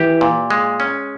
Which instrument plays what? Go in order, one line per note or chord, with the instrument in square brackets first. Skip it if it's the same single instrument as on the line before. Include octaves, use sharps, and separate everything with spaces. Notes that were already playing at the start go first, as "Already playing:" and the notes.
Already playing: [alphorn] E3 [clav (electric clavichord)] G4
[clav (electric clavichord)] A#2
G#3
C#4